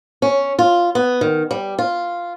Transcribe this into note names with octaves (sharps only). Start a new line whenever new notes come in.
C#4
F4
B3
D#3
G3
F4